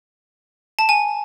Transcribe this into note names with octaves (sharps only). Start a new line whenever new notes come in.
A5
G#5